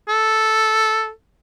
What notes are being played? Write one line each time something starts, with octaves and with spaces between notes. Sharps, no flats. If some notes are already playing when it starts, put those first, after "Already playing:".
A4